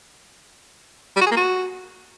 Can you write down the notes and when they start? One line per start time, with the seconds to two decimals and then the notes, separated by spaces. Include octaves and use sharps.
1.16 G3
1.21 F#4
1.26 G#4
1.32 A#3
1.37 F#4